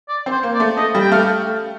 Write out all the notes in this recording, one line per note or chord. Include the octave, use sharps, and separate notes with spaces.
D5
C4 C5
A#3
D5
A3
A3 D#5
G3
G5
A3 F5